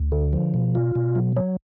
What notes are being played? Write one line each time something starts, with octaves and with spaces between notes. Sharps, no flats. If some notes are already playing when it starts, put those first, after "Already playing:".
Already playing: D2
D3
F3
B2
F4
B2
F#3
F#3